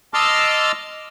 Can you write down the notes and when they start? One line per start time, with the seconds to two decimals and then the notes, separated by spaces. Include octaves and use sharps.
0.14 D#5 A5 C6 D6 E6 F6